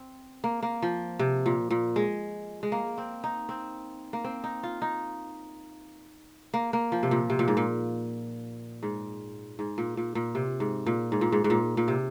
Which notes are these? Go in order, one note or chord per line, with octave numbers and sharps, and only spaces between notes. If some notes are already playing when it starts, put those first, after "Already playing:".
Already playing: C4
A#3
A#3
F3
C3
A#2
A#2
G#3
G#3
A#3
C4
D#4
C4
A#3
C4
D#4
F4
D#4
A#3
A#3
F3
C3
A#2
C3
A#2
G#2
A#2
G#2
G#2
A#2
A#2
A#2
C3
G#2
A#2
G#2
A#2
G#2
G#2
A#2
A#2
C3